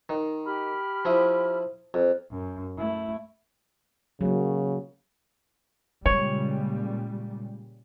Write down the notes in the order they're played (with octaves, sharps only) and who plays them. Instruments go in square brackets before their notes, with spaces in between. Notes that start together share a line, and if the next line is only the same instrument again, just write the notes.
[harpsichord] D#3
[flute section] G4 B5 F6
[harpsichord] F3 E4 D#6
F2
[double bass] F#2
A3 E4
[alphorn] C#3 [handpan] F#3 A#3
[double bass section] A#2 C#3 G3 [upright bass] G#3 [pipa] C#5